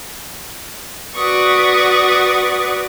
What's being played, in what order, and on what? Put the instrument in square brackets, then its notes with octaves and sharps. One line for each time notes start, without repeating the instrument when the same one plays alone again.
[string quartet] F#4 B4 D5 C#6 D#6